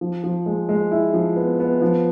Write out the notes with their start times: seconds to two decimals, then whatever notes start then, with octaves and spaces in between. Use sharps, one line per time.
0.01 F3
0.24 F3
0.46 G#3
0.69 G#3
0.91 E4
1.14 F3
1.36 B3
1.60 B3
1.82 F3